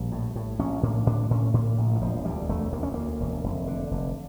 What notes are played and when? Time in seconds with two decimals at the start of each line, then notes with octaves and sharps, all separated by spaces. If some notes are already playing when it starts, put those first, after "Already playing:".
Already playing: A#1 G3
0.12 A2
0.36 A2
0.59 A#1 C#4
0.83 A2 A#3
1.07 A2 D4
1.31 A2 C#4
1.54 A2 A#3
1.78 A#1
1.96 E3
2.01 E1 F3
2.25 D2 G3
2.49 E1 A3
2.73 D2 A#3
2.83 C#4
2.94 D2 A#3
3.20 E1
3.44 F1
3.67 D3
3.91 F1